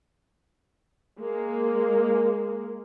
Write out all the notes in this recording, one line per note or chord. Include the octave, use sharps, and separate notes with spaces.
G#3 A#3